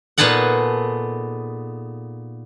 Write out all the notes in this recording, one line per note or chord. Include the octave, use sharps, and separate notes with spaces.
A#2 B3 D#4 G#4 A4 F#5